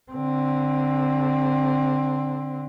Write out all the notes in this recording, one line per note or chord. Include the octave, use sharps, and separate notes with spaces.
D3 C4